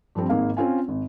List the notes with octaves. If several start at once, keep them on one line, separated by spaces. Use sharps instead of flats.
G2 F3 G3 C4
G#1 G#2 A#3 F5
C4 C#4 F4 G#5
G#1